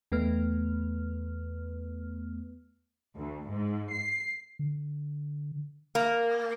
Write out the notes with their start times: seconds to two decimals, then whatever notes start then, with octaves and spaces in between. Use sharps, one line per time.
0.12 E2 A3 B3 B4 F6
3.17 D2
3.49 G#2
3.92 C7
4.59 D3
5.95 A#3